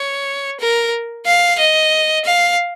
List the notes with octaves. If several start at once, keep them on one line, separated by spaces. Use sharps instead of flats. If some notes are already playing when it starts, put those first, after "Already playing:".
Already playing: C#5
A#4
F5
D#5
F5